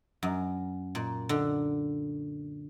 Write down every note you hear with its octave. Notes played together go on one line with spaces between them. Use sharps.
F#2
A#2
D3